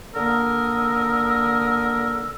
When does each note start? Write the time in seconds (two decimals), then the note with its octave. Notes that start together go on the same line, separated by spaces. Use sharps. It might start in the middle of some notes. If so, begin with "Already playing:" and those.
0.15 D3 A#3 A#4 D#6 E6